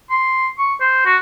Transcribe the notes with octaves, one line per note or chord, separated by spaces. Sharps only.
C6
C#6
C5
F#4